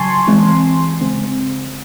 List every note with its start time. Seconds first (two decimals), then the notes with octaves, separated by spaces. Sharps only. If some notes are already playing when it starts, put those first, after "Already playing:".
Already playing: C#3 F#3 G#5 A5 C6 C#6
0.27 E3 G#3 C4
1.01 C#3 G#3 C4